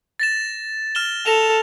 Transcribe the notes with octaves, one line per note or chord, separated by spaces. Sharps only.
A6 A#6 E7
F6 E7 G7
A4 A#6 E7 F7